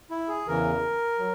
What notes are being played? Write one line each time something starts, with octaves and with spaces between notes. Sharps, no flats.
E4
G#4
E2 C#3 E3 A#4
F#3